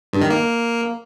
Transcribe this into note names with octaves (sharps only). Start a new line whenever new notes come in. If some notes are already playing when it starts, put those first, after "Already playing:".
G2
D#3
A#3